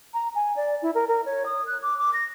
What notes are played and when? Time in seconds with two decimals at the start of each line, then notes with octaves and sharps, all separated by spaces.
0.14 A#5
0.35 G#5
0.56 D5
0.82 E4
0.95 A#4
1.08 A#4
1.26 C#5
1.46 D#6
1.67 F#6
1.82 D6
1.98 D6
2.13 A#6